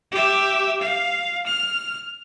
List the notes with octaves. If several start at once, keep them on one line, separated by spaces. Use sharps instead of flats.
G4 E5
F5
F6